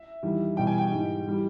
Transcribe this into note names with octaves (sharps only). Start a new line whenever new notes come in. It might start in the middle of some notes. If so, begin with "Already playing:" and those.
Already playing: E5
E2 D#3 G3
E2 B2 G3 G5
G#5
G5
G#2 E3 G3
E3 G3